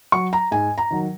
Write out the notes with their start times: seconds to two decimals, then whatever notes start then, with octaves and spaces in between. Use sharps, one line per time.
0.12 F#3 C#6
0.33 A#5
0.51 G#2 G#5
0.78 A#5
0.91 D#3 F#3